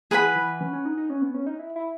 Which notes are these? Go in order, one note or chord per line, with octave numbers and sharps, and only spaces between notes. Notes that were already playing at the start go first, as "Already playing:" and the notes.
E3 G#4 B4 F#5 B5
E3
C#4
C#4
D#4
D#4
C#4
B3
C#4
D#4
E4
E4